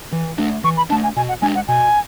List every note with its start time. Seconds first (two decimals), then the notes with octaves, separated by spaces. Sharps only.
0.12 E3
0.38 A3 D4
0.64 E3 C#6
0.77 B5
0.90 A3 D4 A5
1.03 G#5
1.16 B2 G#5
1.29 F#5
1.42 G#3 D4 G#5
1.55 F#5
1.68 B2 G#5